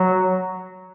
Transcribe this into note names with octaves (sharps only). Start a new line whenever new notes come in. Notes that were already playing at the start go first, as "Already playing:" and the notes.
Already playing: F#3